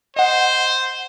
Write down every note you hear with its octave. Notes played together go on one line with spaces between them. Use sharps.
C5 D#5 F#5